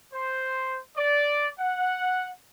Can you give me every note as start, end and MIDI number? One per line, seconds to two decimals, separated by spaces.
0.13 0.78 72
0.96 1.47 74
1.58 2.29 78